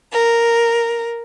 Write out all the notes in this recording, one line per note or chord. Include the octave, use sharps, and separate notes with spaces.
A#4